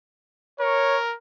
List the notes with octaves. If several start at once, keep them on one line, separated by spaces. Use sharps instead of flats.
A#4 C#5